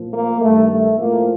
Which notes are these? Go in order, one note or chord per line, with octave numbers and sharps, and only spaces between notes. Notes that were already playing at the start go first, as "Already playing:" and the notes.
Already playing: A#2 F3
A#3
G2 D#3 A3
A3
A2 F3 A#3